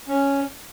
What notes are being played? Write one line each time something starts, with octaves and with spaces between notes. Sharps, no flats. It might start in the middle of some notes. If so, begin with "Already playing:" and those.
C#4